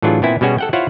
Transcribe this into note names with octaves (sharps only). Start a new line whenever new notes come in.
A2 E3 F#3 D4 F4 G#4
A#2 B3 C4 E4 G#5
B2 G3 C#4 F#4 G#4
A4 F#5 G5
E4 F4 C5 C#5 F5 F#5